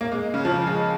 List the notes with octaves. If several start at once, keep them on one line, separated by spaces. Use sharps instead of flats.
A#3
G#3
C#3
F3
G#3